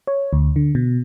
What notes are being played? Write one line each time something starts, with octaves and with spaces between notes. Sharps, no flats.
C#5
D2
D3
B2